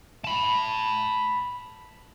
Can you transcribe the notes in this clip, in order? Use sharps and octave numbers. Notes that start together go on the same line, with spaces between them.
A5 B5